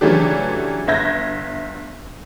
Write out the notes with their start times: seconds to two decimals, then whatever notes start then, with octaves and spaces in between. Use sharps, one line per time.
0.01 C#3 E3 F#3 A3 D4 G4
0.88 G1 E5 G6 G#6 A#6